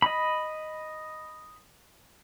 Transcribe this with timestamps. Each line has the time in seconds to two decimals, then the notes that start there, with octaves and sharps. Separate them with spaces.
0.02 D#5 B5